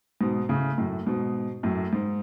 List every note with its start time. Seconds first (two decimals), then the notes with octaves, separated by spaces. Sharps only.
0.21 G#2 B2
0.49 A2 C#3
0.78 F#2 A2
1.07 G#2 B2
1.63 F#2 A2
1.93 G#2